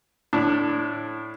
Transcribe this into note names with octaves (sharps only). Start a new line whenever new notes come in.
A2 D4